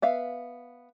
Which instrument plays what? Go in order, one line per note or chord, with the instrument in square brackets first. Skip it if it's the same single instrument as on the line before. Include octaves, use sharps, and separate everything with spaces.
[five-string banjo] B3 E5 F5